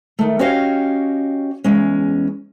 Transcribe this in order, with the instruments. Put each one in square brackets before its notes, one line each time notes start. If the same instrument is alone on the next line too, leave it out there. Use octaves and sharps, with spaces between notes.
[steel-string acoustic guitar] D#3 A3
C#4 F#4 G4 C#5 D#5 F5
E2 G#3 C#4